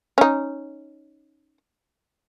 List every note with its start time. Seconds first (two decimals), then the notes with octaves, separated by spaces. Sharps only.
0.18 C#4 D#4